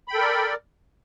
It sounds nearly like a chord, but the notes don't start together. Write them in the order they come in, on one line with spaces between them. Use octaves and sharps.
B5 G5 A4 A#4 D5